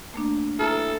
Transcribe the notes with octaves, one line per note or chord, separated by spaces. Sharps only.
A3 A#3 D4
E4 A4 A5 A#5 F6